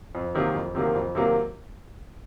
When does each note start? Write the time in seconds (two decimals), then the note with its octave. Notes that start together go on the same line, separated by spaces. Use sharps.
0.15 F2
0.35 C3 D#3 F#3 A#3
0.55 F2
0.75 C3 D#3 F#3 A#3
0.95 F2
1.15 C3 D#3 F#3 A#3